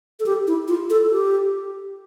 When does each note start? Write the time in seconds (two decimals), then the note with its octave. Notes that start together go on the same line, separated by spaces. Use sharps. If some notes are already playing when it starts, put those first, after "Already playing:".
0.20 A4
0.26 G4
0.47 E4
0.68 F4
0.90 A4
1.11 G4